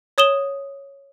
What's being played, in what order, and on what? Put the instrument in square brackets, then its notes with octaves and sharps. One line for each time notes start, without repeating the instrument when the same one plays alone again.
[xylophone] C#5 D#6 E7 G7